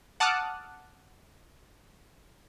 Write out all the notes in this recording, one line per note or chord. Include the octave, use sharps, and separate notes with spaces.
F#5 A5 D6 D#6 F6 F#6